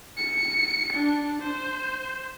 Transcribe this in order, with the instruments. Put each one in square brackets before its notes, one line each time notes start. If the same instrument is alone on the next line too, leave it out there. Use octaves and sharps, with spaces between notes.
[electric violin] C#7
D4
C5